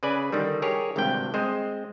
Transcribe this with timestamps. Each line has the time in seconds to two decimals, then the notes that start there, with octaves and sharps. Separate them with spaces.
0.03 C#3 B4 D5 G#5
0.32 D3 D#3 G3
0.62 G4 G#4 A#4 C#5
0.96 G#1 D2 G2 C3 G5
1.34 G#3 C4 C5 D#5